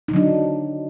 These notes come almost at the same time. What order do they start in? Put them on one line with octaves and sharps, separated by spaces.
D#4 D3 F#3 D4